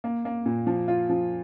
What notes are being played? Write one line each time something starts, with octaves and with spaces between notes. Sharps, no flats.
A#3
A#3
A#2
F3
F4
F3